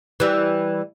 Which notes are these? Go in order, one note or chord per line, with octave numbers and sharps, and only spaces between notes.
E3 G3